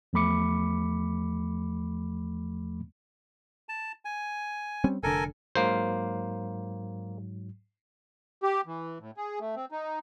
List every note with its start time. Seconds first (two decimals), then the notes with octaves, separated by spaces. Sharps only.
0.13 E2 F3 A3 B5 D6 C#7
3.69 A5
4.05 G#5
4.84 G3 C4 C#4
5.03 F1 D3 A4 A#4 G#5
5.55 G#2 F#3 A#3 C5
8.42 G4
8.67 E3
9.00 A2
9.17 G#4
9.40 A3
9.56 C4
9.72 D#4